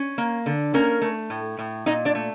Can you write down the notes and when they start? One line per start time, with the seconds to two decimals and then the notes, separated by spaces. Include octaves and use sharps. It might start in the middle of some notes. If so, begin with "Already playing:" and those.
Already playing: C#4
0.18 A#3
0.46 D3
0.74 A#3 C#4 A#4
1.02 A3
1.30 A2
1.59 A2
1.86 A#2 D#4 D#5
2.05 D4 D5
2.15 A3